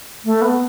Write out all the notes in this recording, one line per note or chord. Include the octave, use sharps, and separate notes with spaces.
A3
B3